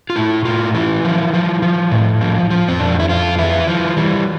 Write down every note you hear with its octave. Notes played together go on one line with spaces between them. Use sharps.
F4
A2 E4
A2 F4
E3 E4
F3
F3
F3
A2
F3
F3
C4
F2 D4
E4
F2 F4
E3 E4
E3 F3
E3 G3